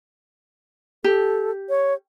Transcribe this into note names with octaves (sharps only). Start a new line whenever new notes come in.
G4 A4
C#5